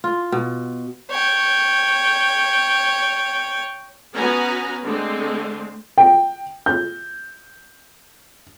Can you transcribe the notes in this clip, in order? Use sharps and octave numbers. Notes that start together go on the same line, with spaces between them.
F4
B2
C#5 G5
B3 C#4 F#4 B4 G#5 A#5
D3 G#3 A3 C4
G5
G6